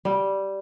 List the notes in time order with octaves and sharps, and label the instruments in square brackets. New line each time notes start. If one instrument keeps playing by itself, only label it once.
[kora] G3